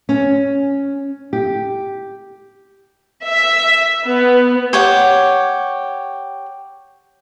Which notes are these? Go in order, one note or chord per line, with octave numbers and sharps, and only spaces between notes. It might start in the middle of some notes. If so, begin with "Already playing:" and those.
C#4
G4
E5
B3
G4 C#5 F#5